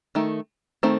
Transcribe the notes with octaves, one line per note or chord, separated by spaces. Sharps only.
D#3 A3
D#3 A3 C4